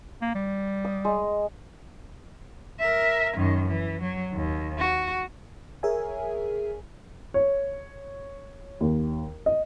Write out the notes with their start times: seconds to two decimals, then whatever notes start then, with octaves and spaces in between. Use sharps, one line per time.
0.22 A#3
0.35 G3
0.85 D#6
1.05 G#3
2.79 A#4 E5
3.37 F#2 D#3
3.68 E3
4.01 F#3
4.33 D#2
4.79 F#4
5.83 G#4 A#4 C#5 E5 G#5
7.34 C#5
8.81 D#2
9.46 D#5